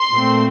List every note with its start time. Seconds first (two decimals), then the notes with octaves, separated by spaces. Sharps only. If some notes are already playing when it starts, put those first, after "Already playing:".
Already playing: C6
0.12 A#2 A3 C4